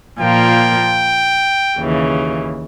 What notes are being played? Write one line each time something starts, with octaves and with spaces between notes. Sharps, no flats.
A#2 F3 A#3 G5
D#2 C#3 E3